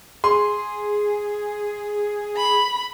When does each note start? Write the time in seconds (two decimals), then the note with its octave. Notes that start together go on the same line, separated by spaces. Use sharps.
0.24 G#4 C6
2.37 B5